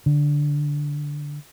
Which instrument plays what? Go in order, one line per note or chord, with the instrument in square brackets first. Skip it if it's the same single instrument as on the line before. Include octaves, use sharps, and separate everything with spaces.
[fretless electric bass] D3